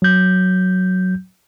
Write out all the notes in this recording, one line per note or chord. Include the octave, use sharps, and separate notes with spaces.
F#3 G6